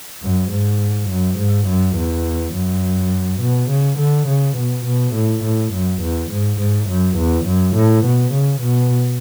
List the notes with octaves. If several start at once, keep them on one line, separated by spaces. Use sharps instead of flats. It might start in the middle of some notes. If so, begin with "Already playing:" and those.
F#2
G#2
F#2
G#2
F#2
E2
F#2
B2
C#3
D3
C#3
B2
B2
A2
A2
F#2
E2
G#2
G#2
F#2
E2
F#2
A2
B2
C#3
B2